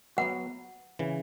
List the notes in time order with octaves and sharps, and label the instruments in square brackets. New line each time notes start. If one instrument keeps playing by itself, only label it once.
[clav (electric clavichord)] F#3 B3 F#4 [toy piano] F#5
[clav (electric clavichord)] C#3 E3